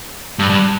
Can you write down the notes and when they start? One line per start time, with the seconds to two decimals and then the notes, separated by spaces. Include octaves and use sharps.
0.39 G2
0.50 G2